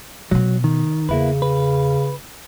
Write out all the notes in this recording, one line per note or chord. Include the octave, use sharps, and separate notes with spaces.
B2 F#3 B3
D#3
E2 C#3 A#3 E4 B4
B4